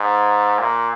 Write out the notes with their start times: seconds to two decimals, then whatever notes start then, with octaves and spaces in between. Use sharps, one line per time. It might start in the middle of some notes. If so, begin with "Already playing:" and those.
Already playing: G#2
0.59 A#2